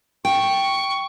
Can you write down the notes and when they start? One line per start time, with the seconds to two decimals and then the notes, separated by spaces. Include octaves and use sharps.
0.25 G5 C#6